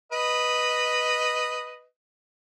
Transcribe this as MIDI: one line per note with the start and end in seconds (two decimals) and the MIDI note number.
0.12 1.85 71
0.12 1.85 75